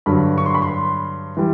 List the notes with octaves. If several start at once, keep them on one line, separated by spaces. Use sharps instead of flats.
G2 D3 F#3 B5
C#6
C6
B5
C6
E3 G3